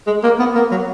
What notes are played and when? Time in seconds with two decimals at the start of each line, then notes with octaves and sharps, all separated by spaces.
0.07 G#3
0.23 A#3
0.39 B3
0.55 A#3
0.71 F#3